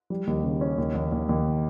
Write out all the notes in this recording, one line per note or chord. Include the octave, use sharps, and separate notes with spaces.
G3
D#2
C#3
C#4
D#2
D#2
D#2
D#2